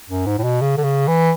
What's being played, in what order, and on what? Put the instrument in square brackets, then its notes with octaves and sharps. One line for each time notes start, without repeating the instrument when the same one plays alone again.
[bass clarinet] F#2
G#2
A2
B2
C#3
D3
C#3
E3